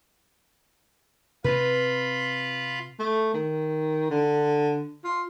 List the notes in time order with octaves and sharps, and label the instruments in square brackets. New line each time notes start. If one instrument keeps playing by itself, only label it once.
[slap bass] C3 C4 [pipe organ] F4 B5 [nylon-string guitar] B4
[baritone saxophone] A3
D#3
D3
F4